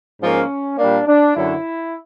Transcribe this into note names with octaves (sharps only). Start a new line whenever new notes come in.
G#2 F3 A#3 C#4
A#2 G3 A#3 D4
D4
F#2 D3 F#3 E4